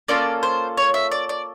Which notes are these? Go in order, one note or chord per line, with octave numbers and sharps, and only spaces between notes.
A#3 C#4 F4 A4 D5
C5
C#5
E5
D5
D5